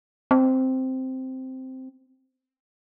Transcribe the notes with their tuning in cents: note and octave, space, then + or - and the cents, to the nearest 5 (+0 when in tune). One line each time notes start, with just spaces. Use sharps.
C4 -5